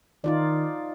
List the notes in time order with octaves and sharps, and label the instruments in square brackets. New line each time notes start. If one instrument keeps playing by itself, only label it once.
[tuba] D#3 [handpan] D#4 F4 D5